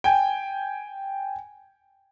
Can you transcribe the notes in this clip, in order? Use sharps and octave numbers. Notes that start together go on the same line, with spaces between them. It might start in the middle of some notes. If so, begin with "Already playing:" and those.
G5 G#5